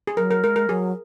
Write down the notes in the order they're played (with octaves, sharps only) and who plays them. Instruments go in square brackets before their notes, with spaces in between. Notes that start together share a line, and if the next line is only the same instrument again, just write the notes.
[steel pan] G#4
[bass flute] F#3 [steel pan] A#4
[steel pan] A#4
[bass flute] G#3 [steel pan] A#4
[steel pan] A#4
[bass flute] F#3 [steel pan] G#4